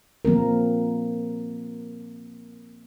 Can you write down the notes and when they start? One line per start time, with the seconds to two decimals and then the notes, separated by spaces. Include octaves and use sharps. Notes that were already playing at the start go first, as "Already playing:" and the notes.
0.25 F3 A#3 C4 A#4